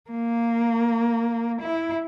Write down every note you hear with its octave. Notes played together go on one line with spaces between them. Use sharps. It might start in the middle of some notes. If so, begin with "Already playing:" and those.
A#3
E4